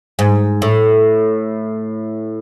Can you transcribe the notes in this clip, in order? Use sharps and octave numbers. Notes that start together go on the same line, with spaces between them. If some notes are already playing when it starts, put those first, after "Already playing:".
G#2
A2